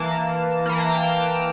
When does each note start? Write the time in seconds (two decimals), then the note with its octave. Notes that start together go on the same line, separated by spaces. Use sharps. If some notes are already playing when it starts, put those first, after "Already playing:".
Already playing: E3 A#3 A5
0.66 E3 A#3 A#5
0.77 A5
0.88 G5
1.01 A5